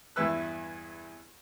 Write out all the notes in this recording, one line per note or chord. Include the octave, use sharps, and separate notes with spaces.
E2 G2 E4 B4 E6 F#6